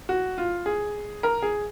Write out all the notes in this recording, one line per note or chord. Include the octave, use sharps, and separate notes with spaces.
F#4
F4
G#4
A#4
G#4